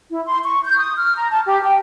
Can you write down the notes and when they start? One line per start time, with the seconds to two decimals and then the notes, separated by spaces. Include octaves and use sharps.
0.10 E4
0.26 C6
0.44 C#6
0.64 G6
0.77 D#6
0.97 F6
1.15 A#5
1.30 A5
1.45 G4
1.62 G5